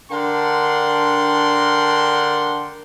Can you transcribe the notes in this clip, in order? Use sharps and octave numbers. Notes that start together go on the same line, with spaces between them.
D3 D4 A#4 F#5 G5 C6